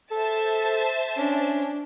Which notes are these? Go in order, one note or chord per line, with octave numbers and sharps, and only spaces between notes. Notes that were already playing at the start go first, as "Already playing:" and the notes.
A4 C5 E5 A5
C#4 D4